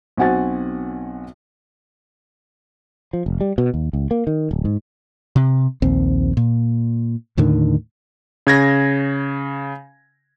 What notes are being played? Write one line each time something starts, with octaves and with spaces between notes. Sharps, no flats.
B1 C4 F#4 F#5 G#5 A6
F3
F1
G3
B2
D#2
C#2
A#3
D#3
D1
G#2
C3
A#1 D#2 C4
A#2
D#2 A2 D3 D#3
C#3 G#6 A#6